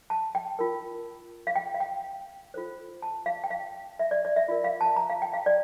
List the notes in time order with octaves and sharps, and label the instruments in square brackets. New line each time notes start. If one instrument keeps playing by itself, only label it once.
[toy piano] A5
G5
F4 A#4
F5
G5
F5
G5
F4 A4 C5
A5
F5
G5
F5
E5
D5
D5
E5
F4 A#4
F5
A5
A#5
F5
G5
F5
D5